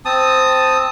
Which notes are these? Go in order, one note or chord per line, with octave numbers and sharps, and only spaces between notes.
C4 A5 D#6